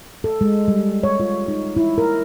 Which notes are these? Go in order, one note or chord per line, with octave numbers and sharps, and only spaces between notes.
A4
G#3
G3
C#5
F4
D#4
E4
A#4